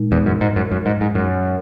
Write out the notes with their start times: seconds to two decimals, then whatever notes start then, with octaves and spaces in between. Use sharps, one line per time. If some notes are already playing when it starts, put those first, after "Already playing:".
Already playing: A#2 G#3 D#4
0.12 E2
0.26 F#2
0.41 G#2
0.56 F#2
0.72 F#2
0.86 G#2
1.01 G#2
1.15 F#2